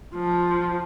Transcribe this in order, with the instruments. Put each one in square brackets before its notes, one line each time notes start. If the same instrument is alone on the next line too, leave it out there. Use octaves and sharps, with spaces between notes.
[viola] F3